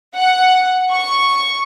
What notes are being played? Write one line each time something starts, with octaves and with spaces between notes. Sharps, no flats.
F#5
C#6